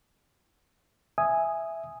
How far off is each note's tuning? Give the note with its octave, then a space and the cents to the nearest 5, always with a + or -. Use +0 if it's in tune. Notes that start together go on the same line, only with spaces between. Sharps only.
E5 +0 G#5 +0 D#6 +0